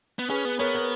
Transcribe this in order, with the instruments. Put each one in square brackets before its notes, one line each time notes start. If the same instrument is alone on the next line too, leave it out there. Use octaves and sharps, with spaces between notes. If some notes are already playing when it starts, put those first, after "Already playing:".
[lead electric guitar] B3
[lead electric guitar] C#4 [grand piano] G#4 B4
[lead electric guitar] B3
[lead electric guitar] B3 [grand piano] A#4 C#5
[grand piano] A#4 C#5